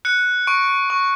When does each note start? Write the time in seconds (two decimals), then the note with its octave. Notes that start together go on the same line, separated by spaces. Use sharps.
0.05 F#6 C#7
0.47 C#6 D7
0.90 C#6